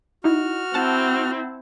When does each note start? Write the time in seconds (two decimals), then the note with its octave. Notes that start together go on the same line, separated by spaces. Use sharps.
0.24 D#4 E4 F#4 F6
0.74 C4 E4 F#5 A5